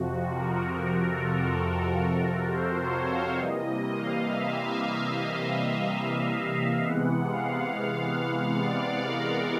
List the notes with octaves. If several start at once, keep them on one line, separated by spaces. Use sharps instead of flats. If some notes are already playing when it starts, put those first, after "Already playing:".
Already playing: F2 C3 F3 F#4
A#4
A#4
A4
A#4
C5
C#5
F5
C3 E3 G3 A#3 D#5
F5
E5
F5
D#5
E5
F5
E5
F5
C3 E3 G#3 B3 F#5
F5
F5
F5
D5
A#4